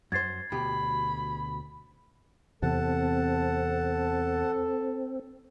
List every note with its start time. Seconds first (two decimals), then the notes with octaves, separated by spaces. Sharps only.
0.12 F#2 C5 G#6 A6 C7
0.52 D2 B2 G4 B5
2.62 E2 C3 C4 A4 F#5 A5